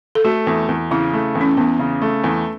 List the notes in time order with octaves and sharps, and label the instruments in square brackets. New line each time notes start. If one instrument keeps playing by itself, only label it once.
[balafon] A4
[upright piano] A3 [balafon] F#4
[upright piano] E2
E2
[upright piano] C#3 [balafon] E4
[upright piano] A3
E2
[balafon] C#4
[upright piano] E2 [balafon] B3
[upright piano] C#3
A3
E2